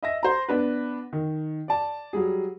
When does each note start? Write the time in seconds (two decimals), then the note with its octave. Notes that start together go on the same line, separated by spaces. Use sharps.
0.03 D#5 E5 A#6
0.23 C5 A#5
0.48 B3 D4 B4
1.13 D#3
1.68 D5 A5
2.13 F#3 G3 G#4